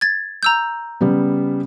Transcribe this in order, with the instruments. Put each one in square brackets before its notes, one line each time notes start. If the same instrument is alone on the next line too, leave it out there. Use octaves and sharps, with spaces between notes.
[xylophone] G#6 A6
A#5 E6 G6
[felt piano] C#3 G3 B3